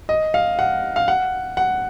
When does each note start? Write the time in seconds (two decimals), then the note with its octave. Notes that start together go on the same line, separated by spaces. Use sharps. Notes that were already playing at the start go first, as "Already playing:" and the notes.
0.09 D#5
0.34 F5
0.59 F#5
0.96 F5
1.08 F#5
1.57 F#5